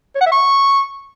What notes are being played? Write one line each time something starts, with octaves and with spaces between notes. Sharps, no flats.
C#5
F#5
E5
C#6